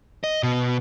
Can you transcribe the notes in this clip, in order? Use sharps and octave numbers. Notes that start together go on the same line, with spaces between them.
D#5
B2